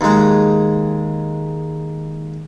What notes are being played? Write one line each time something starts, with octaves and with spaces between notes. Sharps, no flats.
D#2 G#3